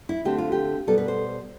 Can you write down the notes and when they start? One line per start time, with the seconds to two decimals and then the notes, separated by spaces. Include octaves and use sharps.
0.09 E4
0.25 D3 A3 C4 G4
0.38 F4
0.52 G4
0.87 B2 G3 B3 A4
0.98 B4
1.08 C5